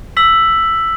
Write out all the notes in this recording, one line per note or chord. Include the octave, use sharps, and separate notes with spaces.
E6 B6 F#7